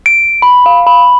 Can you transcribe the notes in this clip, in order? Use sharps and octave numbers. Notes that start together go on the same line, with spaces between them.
D7
B5
F5
B5